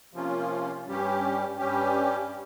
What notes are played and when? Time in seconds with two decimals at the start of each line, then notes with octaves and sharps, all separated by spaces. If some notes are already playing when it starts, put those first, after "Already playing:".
0.13 C3 F3 A#3 C#4 F4
0.86 G2 G3 C#4 G4
1.58 G2 G3 C#4 G4